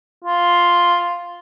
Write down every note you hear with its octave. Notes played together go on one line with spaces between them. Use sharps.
F4